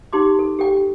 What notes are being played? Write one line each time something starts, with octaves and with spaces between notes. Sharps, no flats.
D#4 G4 C6 D6
A4
G4 A4 G5